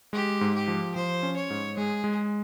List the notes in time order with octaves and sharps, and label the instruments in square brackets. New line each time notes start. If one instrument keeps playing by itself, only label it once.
[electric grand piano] G#3 [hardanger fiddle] G4
[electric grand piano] G#2
[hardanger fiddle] G4
[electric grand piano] F3
[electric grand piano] F3 [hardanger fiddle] C5
[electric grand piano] C#4
[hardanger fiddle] C#5
[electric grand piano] G#2
[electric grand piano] G#3 [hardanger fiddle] G#4
[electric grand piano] G#3